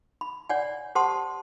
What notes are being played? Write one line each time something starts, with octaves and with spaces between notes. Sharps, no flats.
B5
C#5 D5 F#5 G#5
G4 C5 F#5 A5 C6 D#6